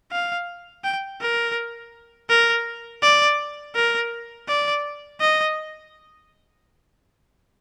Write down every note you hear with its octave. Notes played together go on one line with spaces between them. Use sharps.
F5
G5
A#4
A#4
D5
A#4
D5
D#5